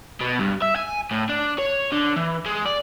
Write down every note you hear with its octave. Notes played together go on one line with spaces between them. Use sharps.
B2
G2
E5
G#5
A2
D4
C#5
D3
E3
G#3
D5